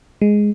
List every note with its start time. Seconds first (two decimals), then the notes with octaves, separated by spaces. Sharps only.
0.22 G#3